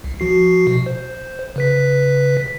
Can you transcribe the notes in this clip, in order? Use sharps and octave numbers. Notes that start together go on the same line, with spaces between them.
C2
F3 F#4 C7
B2
C5
C#3 B4 B6